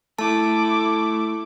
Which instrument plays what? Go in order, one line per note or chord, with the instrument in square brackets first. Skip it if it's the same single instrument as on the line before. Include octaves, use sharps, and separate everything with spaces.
[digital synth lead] A3 [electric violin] E4 D6 [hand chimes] A5